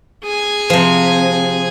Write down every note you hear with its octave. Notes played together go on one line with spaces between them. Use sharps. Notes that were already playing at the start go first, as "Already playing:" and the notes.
G#4 G#5
C3 F3